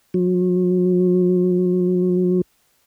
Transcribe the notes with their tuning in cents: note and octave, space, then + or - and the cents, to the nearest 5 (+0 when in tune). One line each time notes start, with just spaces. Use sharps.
F#3 -40